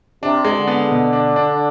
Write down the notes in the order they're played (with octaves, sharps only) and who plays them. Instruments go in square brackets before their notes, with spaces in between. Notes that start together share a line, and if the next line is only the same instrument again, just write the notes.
[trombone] C3 [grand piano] D4
[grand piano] G#3
[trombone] D3
[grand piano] B3
B2
D4
D4